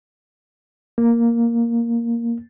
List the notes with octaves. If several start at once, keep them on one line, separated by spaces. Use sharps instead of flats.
A#3